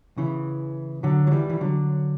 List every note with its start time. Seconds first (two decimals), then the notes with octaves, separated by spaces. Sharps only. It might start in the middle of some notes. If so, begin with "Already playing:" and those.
0.18 C#3 E3
1.03 D3 F#3
1.27 F#3
1.32 E3 G3
1.49 E3
1.61 D3 F#3